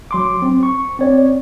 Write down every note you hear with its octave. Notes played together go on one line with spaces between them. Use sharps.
F#3 C6 D6
C4
C#6
C4 C#5 D5